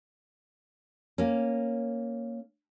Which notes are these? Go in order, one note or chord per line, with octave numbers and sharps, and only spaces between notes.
A#3 C#4